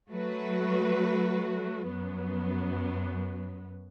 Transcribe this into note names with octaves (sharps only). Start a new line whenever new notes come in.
F#3 A3 F#4 B4
F#2 F#3 B3